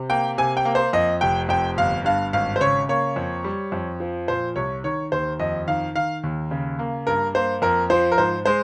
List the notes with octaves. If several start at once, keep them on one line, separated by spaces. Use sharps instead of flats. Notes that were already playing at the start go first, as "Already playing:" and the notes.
Already playing: C3
A#3 G5
C3 G#5
G5
A#3
C5
F2 D#5
F1 G5
F2 G5
G1 F5
G2 F5
G#1 F5
C5
C#3 C#5
A#3 C#5
F2
G3
F2
F3
A#2 C5
C2 C#5
D#3 C#5
D#2 C5
F2 D#5
D#3 F5
D#3 F5
D#2
C#3
A#3
G2 A#4
A#3 C5
F2 A#4
F3 C5
A#4
G#2 C5
G#3 C5